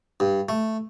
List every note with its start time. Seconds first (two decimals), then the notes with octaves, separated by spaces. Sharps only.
0.20 G2
0.49 A3